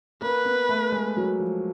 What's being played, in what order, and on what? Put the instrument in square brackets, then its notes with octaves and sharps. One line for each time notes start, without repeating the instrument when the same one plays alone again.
[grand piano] A#3 [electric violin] B4
[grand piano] B3
A3
G#3
F#3
F3